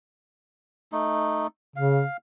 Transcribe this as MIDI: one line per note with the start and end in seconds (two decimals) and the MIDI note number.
0.92 1.47 57
0.92 1.47 63
1.76 2.03 49
1.76 2.17 77